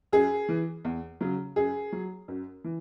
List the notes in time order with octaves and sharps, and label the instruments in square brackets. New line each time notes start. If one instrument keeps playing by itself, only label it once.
[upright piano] F#2 G#4
E3
E2
C#3 F#3
F#2 G#4
F#3
F#2
E3